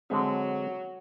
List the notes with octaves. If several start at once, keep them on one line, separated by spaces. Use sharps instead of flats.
D3 F#3 G#3 C4